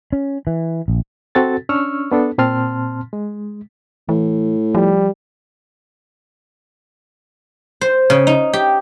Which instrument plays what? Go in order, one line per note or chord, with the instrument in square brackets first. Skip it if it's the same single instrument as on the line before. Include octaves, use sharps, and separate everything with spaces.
[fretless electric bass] C#4
E3
A#1
[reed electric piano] C4 F#4 A4 A6
C#4 D4 C#6 E6 F6
B3 D4 A4
A#2 C4 A5 C6 F6
G#3
[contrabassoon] A2 [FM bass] E3
[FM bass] F3 [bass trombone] G3
[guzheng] C5
C#3
D#4
G4